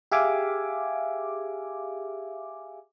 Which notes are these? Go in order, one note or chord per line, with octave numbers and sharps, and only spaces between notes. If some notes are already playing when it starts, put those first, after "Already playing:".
G4 G#4 E5 F5 G#5 D6